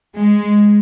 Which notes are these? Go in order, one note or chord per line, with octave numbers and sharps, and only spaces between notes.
G#3